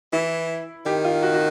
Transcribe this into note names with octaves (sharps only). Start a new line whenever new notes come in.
E3 E4
D#3 G4
F4
F#4
F#4